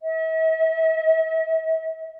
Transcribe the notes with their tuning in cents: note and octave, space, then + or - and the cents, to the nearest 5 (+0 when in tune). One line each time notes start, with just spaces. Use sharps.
E5 -45